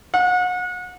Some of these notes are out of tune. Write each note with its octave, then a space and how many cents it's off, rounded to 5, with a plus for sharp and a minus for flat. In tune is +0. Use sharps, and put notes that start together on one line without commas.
F#5 -35